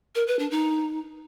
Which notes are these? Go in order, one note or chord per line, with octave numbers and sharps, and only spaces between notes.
A#4
B4
D4
D#4